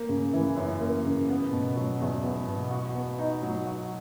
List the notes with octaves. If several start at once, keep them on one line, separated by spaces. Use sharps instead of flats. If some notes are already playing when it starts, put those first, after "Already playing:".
Already playing: A#3
C#3
E3
F#2
A#3
C#3
B3
B2
F#3
E2
B3
B2
F#4
B3
D#4
F#3
F#4